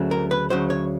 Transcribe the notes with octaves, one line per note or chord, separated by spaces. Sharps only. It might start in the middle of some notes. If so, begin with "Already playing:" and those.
Already playing: D2 C#3 F#3 A3
A#4
B4
D2 C#3 F#3 C5
C#5